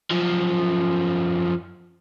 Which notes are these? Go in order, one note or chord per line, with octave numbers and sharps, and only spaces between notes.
F#2 F3